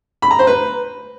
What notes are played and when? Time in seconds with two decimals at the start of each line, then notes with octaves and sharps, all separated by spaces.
0.22 B5
0.31 A#5
0.39 C5
0.47 B4